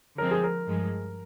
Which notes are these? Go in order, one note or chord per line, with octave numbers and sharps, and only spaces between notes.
D3 F3 G#3 C4 A#4
G#4
A#4
G2 F3 G#3